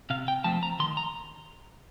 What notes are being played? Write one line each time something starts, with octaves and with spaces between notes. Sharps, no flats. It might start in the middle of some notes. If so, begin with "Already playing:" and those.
C3 F5
G5
F3 A3 C4 A5
A#5
D#3 C6
A#5